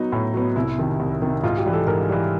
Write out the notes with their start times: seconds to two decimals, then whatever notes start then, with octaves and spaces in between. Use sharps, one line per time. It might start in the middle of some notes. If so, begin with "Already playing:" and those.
Already playing: F#3 B3 D#4
0.12 A2
0.34 F#3 B3
0.56 C2 E4
0.78 C3 D#3
1.00 C2
1.22 C3 D#3
1.44 G#2 F4
1.58 G4
1.66 E3 G3
1.73 A4
1.87 G#2 A#4
2.09 E3 G3